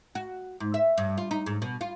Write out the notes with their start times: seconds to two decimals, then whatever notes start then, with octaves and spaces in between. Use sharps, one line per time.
0.15 F#4
0.60 G#2
0.74 E5
0.98 G2
1.18 F4
1.31 D#4
1.46 G#2
1.62 B2
1.81 F4